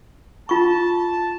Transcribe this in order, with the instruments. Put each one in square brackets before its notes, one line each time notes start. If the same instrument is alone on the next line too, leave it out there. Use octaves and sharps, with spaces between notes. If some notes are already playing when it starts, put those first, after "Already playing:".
[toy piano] F4 C#6 [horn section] A5